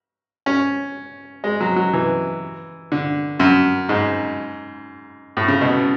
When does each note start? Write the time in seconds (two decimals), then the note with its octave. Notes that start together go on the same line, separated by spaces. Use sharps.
0.46 C#4
1.44 G#3
1.60 F#3
1.76 F#3
1.93 E3
2.92 D3
3.40 F#2
3.89 G#2
5.37 A2
5.48 C#3
5.61 B2